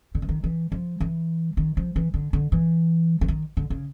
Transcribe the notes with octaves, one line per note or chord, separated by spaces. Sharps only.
D3
E3
D#3
E3
F3
E3
D#3
F3
E3
D3
D3
E3
E3
D#3
D3
C#3